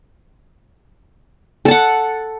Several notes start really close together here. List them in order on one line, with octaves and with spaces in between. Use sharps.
A4 A5 F#5